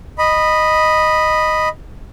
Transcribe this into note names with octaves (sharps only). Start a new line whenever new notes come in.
D#5 B5